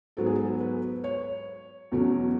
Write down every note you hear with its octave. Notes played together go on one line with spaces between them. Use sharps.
G#2 F#3 B3 A4
G#4
A4
B4
C#5
E2 B2 F#3 A3 C#4